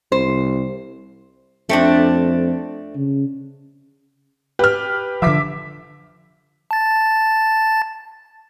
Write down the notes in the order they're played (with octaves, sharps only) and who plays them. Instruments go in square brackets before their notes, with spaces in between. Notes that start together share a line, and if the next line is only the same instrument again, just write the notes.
[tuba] C2 [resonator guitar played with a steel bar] C5
[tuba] F2 [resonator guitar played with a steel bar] A3 C4 D4
[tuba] C#3
[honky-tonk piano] G4 [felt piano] B4 F6
[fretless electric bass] D3 F3 [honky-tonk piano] E5 D6 B6
[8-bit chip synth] A5 A6